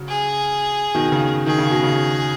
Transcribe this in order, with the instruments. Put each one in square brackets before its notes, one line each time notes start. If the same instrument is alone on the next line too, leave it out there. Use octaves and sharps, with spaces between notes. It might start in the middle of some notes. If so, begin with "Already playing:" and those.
Already playing: [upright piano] C#3 F#3
[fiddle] G#4
[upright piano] B2 D#3
C#3
[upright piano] D#3 [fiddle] G#4
[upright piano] C#3
B2
C#3